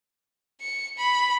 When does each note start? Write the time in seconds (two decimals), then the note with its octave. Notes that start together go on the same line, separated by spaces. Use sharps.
0.61 C#7
0.97 B5